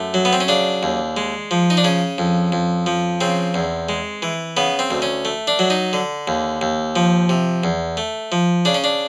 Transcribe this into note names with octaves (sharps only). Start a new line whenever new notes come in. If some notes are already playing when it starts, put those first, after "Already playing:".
Already playing: F#2 A3
F#3
B3
C4
C#4
C#3 D4
D#2
G#3
F3
D#4
D4
C#3 C#4
F2
F2
F3
C#3 C4
E2
G#3
E3
C#3 B3
C4
D2
C#4
A3
D4
F#3
D#4
D3
D#2
D#2
F3
C3
E2
A3
F3
C#3 D4
C#4
D4